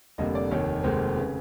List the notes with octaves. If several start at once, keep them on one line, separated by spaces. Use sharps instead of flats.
F1 F2 D3 G3 A#3 D#5
D5
F1 D#2 D#3 C#5
F1 D#2 D#3 G#3 C5
C#3 B4